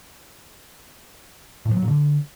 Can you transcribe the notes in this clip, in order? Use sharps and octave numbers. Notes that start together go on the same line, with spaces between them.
A2
F3
F#3
A#2
D3